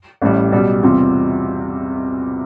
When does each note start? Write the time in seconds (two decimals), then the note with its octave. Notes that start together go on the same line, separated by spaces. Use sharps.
0.22 A1 A2 G3
0.52 B1 B2 G3
0.83 E2 C3 G3 C4 F4